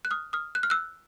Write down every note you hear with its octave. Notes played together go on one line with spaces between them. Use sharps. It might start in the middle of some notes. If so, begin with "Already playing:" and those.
F#6
D#6 F6
D#6 F6
F#6
F6
E6 F#6